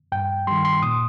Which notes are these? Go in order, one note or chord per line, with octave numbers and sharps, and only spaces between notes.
G2 G5
D#3 G3 C6
C6
A#2 D#6